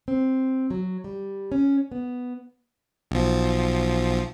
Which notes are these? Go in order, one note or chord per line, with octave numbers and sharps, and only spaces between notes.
C4
F#3
G3
C#4
B3
B1 F3